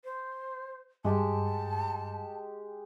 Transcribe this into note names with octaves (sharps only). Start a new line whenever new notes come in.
C5
G2 G#3 G4 A5